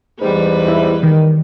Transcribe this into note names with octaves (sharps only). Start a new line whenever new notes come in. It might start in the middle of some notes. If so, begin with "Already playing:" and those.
E2 G#2 G3 B4
E4
D#3